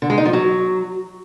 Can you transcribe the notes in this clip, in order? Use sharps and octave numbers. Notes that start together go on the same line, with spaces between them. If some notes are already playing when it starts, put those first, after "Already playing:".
D3
G#3
D#4
F3
F#3